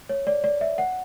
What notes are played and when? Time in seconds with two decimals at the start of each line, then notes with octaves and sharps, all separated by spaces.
0.09 C#5
0.27 D5
0.44 D5
0.61 E5
0.78 F#5